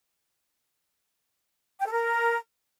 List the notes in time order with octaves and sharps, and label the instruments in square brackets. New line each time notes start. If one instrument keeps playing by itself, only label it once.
[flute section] G5
A4
A#4